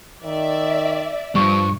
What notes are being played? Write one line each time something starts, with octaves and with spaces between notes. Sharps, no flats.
D#3 D5 E5
G2 F3 C#6